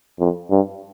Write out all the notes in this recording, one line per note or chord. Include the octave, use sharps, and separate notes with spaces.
F2
G2